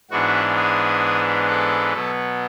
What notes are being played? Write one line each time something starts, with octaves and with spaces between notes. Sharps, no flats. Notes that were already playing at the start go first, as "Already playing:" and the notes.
G#2 E3 B3 D4 F#4
G#4
A4
B2 F#3 B3